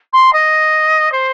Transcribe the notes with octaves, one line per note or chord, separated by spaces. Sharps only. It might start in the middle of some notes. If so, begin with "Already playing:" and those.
C6
D#5
C5